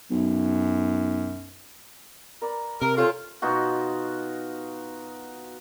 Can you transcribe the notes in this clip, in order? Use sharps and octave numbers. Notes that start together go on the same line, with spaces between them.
B1 F#2
A#4 B4 D5
C3 A#4 A#5
C#4 F4 A4 C5 G#5
B2 D#4 F4 F#4